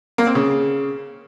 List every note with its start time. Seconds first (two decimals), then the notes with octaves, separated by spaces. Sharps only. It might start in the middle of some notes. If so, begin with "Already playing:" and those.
0.18 A#3
0.27 C4
0.35 C#3